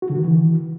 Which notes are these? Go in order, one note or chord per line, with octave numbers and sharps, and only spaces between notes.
F#4
D3
D#3
E3